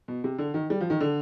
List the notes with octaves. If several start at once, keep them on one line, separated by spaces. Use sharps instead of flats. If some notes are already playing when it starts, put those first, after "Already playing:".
B2
C3
D3
D#3
G3
F3
D#3
D3